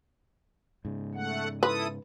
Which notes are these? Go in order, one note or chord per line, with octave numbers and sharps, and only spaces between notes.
G#2 C#3
A3 F#5
E4 A4 B4 D#6